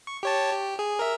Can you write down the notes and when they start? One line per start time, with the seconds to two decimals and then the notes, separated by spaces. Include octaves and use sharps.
0.07 C#6
0.23 G4 C#5 A5
0.53 G4
0.79 G#4
0.99 A#4 E5